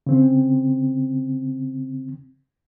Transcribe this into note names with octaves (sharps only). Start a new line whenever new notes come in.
C#3 C4